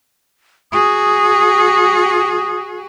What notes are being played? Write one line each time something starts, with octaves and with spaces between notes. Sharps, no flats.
F#4 G#4 D#6